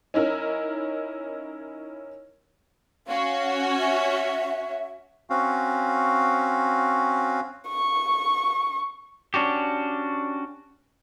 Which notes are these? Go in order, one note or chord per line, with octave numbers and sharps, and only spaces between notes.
C#4 D#4 E4 A#4
C#4 F#4 C#5 F5
E5
C4 C#4 F#4 F5
C#6
C#4 D4 F#4 G4